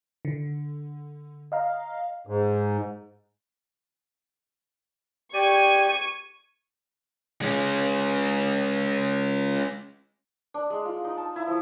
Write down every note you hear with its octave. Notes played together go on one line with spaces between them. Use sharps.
D3
D#5 F5 A#5
G#2
G4 D5 C#6 G#6 D#7
G#3 C#4
D4
G#3
F4
D#4
A5
E4
F3